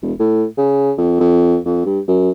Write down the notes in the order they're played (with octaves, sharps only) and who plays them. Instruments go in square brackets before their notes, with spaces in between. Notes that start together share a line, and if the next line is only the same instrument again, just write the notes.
[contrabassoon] E1
A2
C#3
F2
F2
F2
G2
F#2